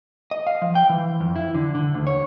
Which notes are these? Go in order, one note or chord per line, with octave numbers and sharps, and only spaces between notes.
D#5
F5
F3
G5
E3
F2
E4
D3
D3
D2
C#5